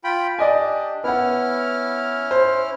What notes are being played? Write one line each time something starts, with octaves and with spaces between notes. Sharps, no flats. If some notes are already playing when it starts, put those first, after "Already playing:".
F4 G5 B5
D4 G4 D5 D#5 G#5
B3 C#4 E4 F#5 F6
C5